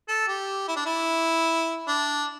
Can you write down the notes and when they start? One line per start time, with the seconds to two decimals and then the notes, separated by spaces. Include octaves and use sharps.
0.08 A4
0.28 G4
0.68 E4
0.76 D4
0.86 E4
1.88 D4